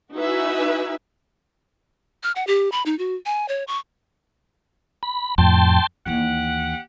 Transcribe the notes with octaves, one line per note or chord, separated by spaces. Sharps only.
D#4 E4 F#4 B4 E5 G#5
F6
F#5
G4
B5
D#4
F#4
G#5
C#5
C#6
B5
F2 A2 G5 A5 C6
D#2 E3 G4 F#5